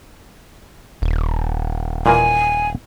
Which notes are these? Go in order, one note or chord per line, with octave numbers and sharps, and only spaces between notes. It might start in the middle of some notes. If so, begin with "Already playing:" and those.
D#1
A#2 E3 A#3 G#5